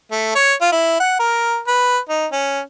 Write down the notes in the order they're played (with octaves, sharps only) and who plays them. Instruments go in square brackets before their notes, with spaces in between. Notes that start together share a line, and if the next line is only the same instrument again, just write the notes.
[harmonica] A3
C#5
F4
E4
F#5
A#4
B4
D#4
C#4